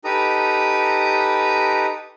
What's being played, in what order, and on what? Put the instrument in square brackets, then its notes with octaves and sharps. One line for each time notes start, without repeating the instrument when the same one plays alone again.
[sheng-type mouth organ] D#4 G4 A4 B4 A#5 D#6